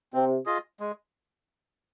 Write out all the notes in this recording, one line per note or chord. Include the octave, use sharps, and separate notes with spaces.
C3 C4
F4 G#4 D#5
G#3